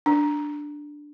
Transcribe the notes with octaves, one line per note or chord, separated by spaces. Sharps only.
D4